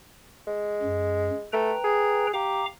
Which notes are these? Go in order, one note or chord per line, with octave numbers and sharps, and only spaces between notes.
G#3
F#2
A3 B4 G5 A#5
G#4
G4 F5 A#5 D6